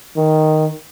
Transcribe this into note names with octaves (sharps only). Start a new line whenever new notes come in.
D#3